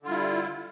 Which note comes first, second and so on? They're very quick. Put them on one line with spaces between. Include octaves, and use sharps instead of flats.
D3 F4 G3 E4